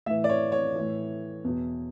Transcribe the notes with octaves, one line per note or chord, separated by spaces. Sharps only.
A2 E3 E5
D5
C#5
C#5
A2 E3
E2 B2